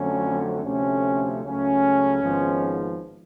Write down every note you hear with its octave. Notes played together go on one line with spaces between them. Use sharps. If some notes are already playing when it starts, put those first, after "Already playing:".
Already playing: F2 D3 F#3 A3 C4 C#4
D2 C3 F3 A3 C#4
C#2 C#3 F#3 A3 C#4
G#1 G#2 F3 G#3 B3